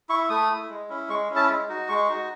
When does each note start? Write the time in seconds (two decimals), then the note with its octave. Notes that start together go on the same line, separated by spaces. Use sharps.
0.09 E4 C#6
0.30 A3 D#6
0.50 E4
0.70 G#3
0.89 C#4 E4
1.09 G#3 C#6
1.30 C#4 E4
1.36 A5
1.49 G#3
1.68 D#4 F#4
1.89 G#3 C#6
2.09 D#4 F#4